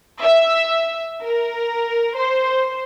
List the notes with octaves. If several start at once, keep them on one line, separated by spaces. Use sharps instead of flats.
E5
A#4
C5